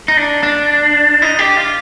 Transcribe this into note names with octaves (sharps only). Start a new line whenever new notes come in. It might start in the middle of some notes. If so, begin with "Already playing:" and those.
D#4
D4
D4
D#4
G4
F4